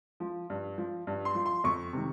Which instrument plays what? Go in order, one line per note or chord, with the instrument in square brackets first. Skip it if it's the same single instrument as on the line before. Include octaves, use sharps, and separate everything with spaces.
[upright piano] F3
G2
F3
G2
C6
F3
C6
F2 C#6
C3 D#3